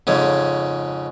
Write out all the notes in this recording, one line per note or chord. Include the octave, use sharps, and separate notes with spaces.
F2 G#2 C#3